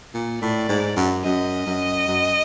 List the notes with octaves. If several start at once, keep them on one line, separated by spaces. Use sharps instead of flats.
A#2
A2 D5
G#2
F#2
F#2 D#5
F#2
F#2